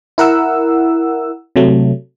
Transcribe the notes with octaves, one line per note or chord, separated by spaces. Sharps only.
E4 A#4 F#5 E6
C3 F#3 A3